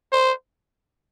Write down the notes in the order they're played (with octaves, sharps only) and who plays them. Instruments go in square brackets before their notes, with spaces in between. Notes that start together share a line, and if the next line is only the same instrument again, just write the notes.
[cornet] C5